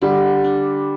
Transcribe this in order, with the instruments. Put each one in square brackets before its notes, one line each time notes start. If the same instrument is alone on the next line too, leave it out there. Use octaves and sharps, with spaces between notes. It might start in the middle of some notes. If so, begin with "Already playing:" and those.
[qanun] D3 [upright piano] G3
[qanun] D4